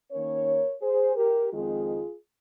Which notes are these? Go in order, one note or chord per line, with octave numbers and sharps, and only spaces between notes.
D#3 A#3 C#4 A#4 C#5
G#4 C5
G4 A#4
F2 D#3 G#3 C4 D#4 F4 G#4